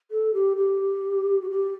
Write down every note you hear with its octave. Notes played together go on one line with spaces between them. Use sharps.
A4
G4
G4
F#4
G4